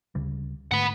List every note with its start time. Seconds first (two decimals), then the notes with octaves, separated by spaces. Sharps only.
0.15 D2 C#3 G3
0.71 G#2 D3 A3 F#5 B5